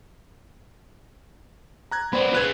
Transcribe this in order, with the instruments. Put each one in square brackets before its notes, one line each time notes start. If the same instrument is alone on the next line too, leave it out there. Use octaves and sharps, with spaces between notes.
[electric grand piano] A#5 F#6 G#6
[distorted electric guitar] B3 C5 [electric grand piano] D5 B5
[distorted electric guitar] F4 G#4 [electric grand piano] B4 F#6 G#6